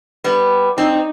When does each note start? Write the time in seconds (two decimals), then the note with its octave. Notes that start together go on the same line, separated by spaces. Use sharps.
0.24 G3 B3
0.78 C4 D#4